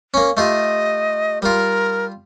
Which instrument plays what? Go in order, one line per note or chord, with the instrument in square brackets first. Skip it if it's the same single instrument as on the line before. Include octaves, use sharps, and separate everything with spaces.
[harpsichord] A#3 C#4
[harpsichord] A3 F4 G4 [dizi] D#5
[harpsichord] G3 F4 [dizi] A#4